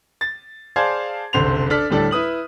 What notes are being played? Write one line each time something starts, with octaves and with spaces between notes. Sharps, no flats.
A6
G#4 C5 D5 F5 A5 G#6
F#1 C2 D3 C5 B5 F7
D4 A4 F6 B6
D2 A2 G3 D4 A4
E4 B4 D#6 F#7